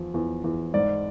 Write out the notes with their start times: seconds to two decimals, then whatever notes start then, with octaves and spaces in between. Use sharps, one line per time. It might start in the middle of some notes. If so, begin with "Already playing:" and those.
Already playing: E2 F3
0.14 E2
0.44 E2
0.74 G#2 D5